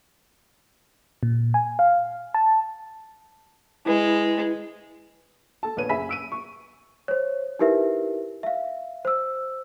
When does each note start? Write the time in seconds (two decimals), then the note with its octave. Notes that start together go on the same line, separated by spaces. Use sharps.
1.23 A#2
1.54 G#5
1.79 F5
2.34 A5
3.86 G#3 E4 B4
5.63 A4 A5
5.77 A#1 B3 B4 C#5 D#7
5.89 F#1 G#4 E5 G#5 B5 B6
6.09 E6 D7 D#7
6.32 C#6
7.08 C5 C#5
7.59 D#4 E4 G4 A#4 B4 E5
8.43 E5 F5
9.05 C5 E6